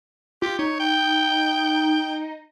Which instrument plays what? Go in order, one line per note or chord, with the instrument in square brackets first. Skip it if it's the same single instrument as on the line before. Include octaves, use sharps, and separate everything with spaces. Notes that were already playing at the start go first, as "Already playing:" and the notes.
[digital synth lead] F4 [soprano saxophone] G4
[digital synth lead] D#4 [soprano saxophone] C#5
[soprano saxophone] G5